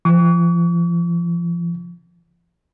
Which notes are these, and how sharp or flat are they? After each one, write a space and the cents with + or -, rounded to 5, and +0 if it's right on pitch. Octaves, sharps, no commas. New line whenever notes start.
F3 -35 C#6 +45